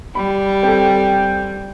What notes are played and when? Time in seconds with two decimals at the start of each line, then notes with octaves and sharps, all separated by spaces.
0.15 G3 B5
0.63 C4 A4 G5